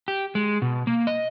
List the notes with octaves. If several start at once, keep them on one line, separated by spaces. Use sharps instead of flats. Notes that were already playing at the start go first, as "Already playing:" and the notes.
G4
G#3
B2
A#3
D#5